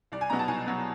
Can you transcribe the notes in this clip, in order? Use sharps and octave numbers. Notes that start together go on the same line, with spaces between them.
C2 D5
G#5
B2 F#3 B3 A#5
A5
C2 G#5
B2 F#3 B3